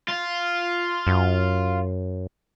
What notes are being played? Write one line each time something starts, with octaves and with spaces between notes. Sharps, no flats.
F4
F#2